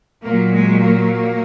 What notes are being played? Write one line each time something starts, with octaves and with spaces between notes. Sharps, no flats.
A#2 F#3 A#3
G#3
A#3